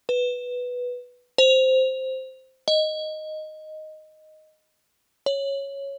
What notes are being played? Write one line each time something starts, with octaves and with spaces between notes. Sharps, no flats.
B4
C5
D#5
C#5